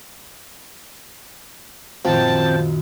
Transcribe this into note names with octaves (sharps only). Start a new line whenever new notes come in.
F#2 A#2 D#3 F3 C4 G5 A5